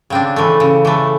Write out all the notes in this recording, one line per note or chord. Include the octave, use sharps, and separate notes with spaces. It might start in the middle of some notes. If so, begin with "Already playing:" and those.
C#3 C4 D4
E3 A3
C#3
E3 A3